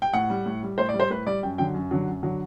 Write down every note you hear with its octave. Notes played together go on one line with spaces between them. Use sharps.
G5
A2 F#5
G3
A2
G3
A2 C5
D5
G3
C5
A2 B4
G3 D5
F#2 G5
D3 F#3 G5
F#2
D3 F#3
F#2
D3 F#3